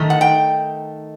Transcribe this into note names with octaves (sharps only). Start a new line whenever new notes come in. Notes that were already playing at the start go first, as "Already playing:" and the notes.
Already playing: D#3 A3 D#4
F#5
G5